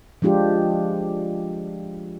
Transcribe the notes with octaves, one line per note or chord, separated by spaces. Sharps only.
F3 G#3 D4 F4 G4